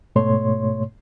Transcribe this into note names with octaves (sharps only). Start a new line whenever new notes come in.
G#2 B2 A3 C#5 C6